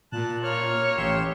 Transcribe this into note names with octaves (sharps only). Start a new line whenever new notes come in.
A#2 A5 F#6
A#3 F4 C#5 F6
A1 G4 C6 E6